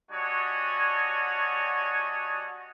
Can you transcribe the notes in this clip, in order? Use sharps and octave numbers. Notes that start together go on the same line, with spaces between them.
G3 D4 F#4 C#5 D#5 G#5